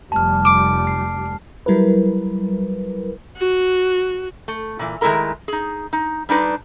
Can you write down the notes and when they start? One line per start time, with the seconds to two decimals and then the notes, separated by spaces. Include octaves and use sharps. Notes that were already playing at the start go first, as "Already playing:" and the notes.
0.12 F1 G3 A5 F6
0.45 D6
0.87 C7
1.66 F#3 G3 E4 A#4 B4
3.37 F#4
4.48 A3
4.79 A#2 E3
5.01 D#3 G#3 A3 E4 A#4 A#5
5.48 D#4 G#4
5.93 D#4
6.29 G3 D4 D#4 B4